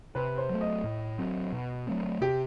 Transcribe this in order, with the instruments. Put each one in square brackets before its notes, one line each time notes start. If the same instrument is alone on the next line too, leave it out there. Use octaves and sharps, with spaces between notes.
[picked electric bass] C3 [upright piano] B4
[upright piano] C5
[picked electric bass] F#3 A3
[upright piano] D#5
[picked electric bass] A2
F#3 C4
B2
F#3 A3 C4
[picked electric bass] C3 [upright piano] G4